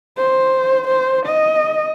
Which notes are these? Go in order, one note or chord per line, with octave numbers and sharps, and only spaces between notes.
C5
C5
D#5